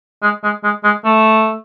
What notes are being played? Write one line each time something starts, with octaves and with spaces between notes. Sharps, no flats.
G#3
G#3
G#3
G#3
A3